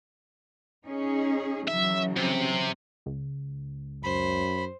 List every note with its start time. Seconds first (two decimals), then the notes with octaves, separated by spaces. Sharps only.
0.86 C#4 D#4 G#4
1.68 C#3 E3 F#3 E5
2.17 C3
3.06 C#2
4.03 F#2 C5 B5